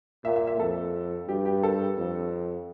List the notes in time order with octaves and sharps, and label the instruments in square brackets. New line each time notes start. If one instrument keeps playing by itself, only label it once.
[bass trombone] A#2 [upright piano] E5
[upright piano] E5
E5
[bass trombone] F2 [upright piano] A4
[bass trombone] G2 [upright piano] G4
[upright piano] G4
A4
[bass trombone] F2